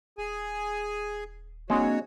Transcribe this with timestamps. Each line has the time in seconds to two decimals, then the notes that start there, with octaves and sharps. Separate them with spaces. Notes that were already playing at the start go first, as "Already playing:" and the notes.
0.18 D#1 G#4 G#5
1.70 G#3 A#3 C4 D4 F#4 C#5